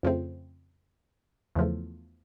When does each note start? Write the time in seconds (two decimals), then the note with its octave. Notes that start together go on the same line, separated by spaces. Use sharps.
0.03 F2 C#3 F3 A3 C4
1.55 E2 C#3 F3 A3